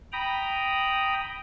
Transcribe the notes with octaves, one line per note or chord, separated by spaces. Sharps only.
G5 A#5 B5 D#6